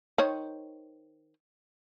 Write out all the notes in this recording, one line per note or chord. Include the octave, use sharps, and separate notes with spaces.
D#3 C5 C#5